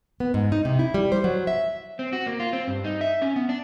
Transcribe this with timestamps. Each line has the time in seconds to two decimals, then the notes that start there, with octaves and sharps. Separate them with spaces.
0.20 B3
0.34 G#2
0.52 D#4
0.65 C3
0.79 E4
0.94 G3
1.12 C5
1.24 F#3
1.47 E5
1.99 C4
2.13 F#4
2.26 A#3
2.40 F4
2.53 C4
2.68 G2
2.84 D#4
3.01 E5
3.22 C#4
3.36 B3
3.49 D4